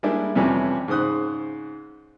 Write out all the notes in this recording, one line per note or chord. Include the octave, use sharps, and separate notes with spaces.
G3 G#3 A#3 D4 E4
F2 C3 E3 G3 C#4
G#2 C#3 C5 D#6 F#6